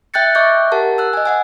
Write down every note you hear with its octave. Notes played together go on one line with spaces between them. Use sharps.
E5 G5 F#6 G6 A6 C#7
D#5 E5 C#6 D6 F#6 G6
G4 A#4 F#5 A5
E6 F#6
D#5 G#5
D#5 F#5 G#5